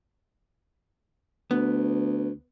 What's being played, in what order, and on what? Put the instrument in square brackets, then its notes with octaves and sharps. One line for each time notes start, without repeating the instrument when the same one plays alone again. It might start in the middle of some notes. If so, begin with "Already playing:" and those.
[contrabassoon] D2 [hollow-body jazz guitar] B3